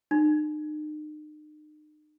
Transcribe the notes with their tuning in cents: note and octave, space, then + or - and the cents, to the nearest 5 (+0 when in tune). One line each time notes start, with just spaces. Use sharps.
D#4 -40